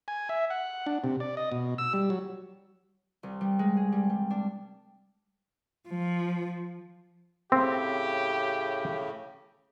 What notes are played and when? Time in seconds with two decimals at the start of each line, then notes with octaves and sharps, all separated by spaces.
0.08 G#5
0.29 E5
0.50 F#5
0.87 D4
1.04 C3
1.20 D5
1.37 D#5
1.52 B2
1.78 E6
1.93 G3
2.10 F#3
3.23 C2
3.41 G3
3.59 G#3
3.77 G#4
3.92 G3
4.10 G3
4.30 D4
5.89 F3
7.52 A2 C#3 C4 G4